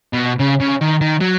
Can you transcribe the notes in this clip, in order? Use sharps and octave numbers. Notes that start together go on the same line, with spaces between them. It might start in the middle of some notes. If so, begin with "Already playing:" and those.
B2
C#3
C#3
D#3
D#3
F#3